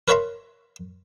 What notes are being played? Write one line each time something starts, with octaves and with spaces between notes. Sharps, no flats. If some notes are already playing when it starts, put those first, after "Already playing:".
A#4 B4 C#5 E5 A#5 C6